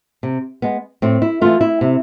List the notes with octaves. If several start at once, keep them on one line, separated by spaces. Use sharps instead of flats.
C3
G#3 B3
A2 C4
E4
E3 A3 F4
E4
C3